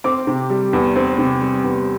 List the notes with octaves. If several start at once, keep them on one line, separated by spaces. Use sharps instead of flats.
C4 D6
C3
G3
E2
C4
C3
G3
E2